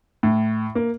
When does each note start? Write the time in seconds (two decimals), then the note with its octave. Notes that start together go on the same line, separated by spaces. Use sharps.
0.23 A2
0.75 A#3